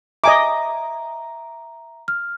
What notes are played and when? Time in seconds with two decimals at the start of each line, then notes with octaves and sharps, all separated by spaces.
0.24 D#5 E5 G#5 A#5 D6
2.08 F6